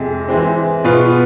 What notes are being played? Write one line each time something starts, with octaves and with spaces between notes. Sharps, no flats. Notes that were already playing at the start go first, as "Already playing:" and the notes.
Already playing: F2 C3 G#3
E3 G#3 C4
B2 B3 F4 B4